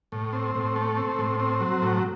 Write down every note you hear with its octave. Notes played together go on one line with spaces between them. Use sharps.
A2
C4
A2
A3
C4
A2
C4
F#3
A2